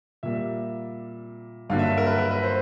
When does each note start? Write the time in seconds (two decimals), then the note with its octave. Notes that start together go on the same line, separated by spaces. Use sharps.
0.23 A#2 G3 A#3 E5
1.69 G2 D3 F#3 A#3 F5
1.79 E5
1.97 A#4
2.07 B4
2.18 A#4
2.31 B4
2.43 C5